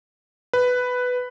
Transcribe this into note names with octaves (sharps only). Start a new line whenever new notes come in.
B4